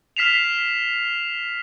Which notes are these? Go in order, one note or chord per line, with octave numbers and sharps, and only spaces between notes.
F6 B6 C7 E7 F7